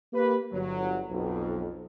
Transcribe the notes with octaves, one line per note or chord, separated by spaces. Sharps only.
A#3 G4 B4
G1 F#3
B1 F2